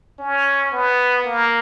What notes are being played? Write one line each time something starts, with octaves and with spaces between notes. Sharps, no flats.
C#4
B3
A#3